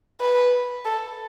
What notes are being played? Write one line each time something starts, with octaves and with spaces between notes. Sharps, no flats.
B4
A4